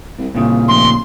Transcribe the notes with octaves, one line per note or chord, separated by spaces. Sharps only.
C2
C2 A#2 C#3
F1 C6